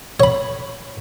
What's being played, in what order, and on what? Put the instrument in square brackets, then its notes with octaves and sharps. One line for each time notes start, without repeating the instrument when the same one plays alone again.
[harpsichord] C#5 B5